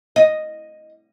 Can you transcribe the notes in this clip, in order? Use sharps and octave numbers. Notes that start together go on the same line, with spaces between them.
D#5